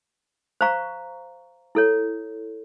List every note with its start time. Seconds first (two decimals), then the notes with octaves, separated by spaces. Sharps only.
0.61 C5 F5 A#5 C#6
1.75 E4 A4 C#5